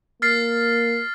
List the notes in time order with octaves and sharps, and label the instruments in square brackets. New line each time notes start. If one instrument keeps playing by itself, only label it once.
[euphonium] A#3 [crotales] F6 A6 C7